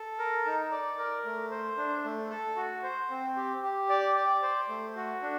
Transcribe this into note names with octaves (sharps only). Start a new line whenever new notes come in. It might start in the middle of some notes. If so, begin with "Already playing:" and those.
Already playing: A4
A#4
D#4
D5
A#4
A3
C5
D4
A3
A4
F#4
C5
C4
G4
G4
D5
D5
C5
A3
F#4
D4